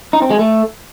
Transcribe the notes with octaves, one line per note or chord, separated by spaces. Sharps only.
D#4
C4
G#3
A3